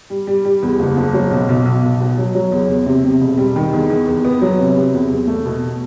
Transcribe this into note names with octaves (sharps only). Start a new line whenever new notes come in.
G3
G3
G3
E2
F#1
F#1
F#3
B1
B1
B1
B1
B2
F#3
F#3
E2
E2
C3
C3
E1
G3
D#3
E2
E2
E2
B3
F#3
C3
C3
E2
E2
A3
B2